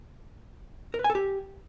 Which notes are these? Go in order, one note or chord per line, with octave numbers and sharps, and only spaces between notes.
A#4
B4
G#5
A4
G4